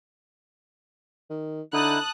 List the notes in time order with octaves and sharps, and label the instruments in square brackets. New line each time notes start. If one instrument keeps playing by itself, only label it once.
[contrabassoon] D#3
[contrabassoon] D3 [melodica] D#4 E4 [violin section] A5 D#6 F#6